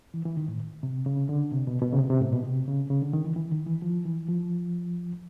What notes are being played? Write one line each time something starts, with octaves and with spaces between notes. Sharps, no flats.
E3
E3
D#3
A2
C3
C#3
D3
C3
B2
B2
C#3
C3
C3
A2
B2
C3
C#3
C#3
D3
D#3
E3
E3
D#3
E3
F3
E3
F3